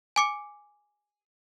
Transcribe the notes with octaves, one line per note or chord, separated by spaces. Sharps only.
G#5 D6 C#7